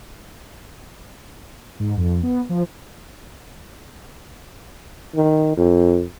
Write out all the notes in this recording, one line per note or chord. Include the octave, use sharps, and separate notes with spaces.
G#2
F2
B3
F3
D#3
F2